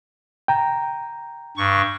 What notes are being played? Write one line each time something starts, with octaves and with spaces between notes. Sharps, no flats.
G5 A#5
G2 C#6